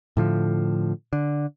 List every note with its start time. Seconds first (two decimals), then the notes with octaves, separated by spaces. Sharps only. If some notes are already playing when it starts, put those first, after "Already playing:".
0.17 A2 D3 F3
1.13 D3